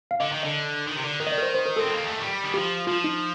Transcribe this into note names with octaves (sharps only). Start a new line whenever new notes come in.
F5
D3 D#5
D#3
D3 D#5
D#3
C3
D3
D#3 A#4
D#5
D5
A#4
C5
C5
A#4
C4 A4
A#3
A3
G3
D#3
F3 G4
F3 F4
D#4